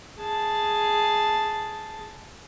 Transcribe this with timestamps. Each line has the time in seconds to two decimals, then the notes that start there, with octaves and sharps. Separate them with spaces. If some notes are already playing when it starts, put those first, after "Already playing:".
0.18 G#4 A5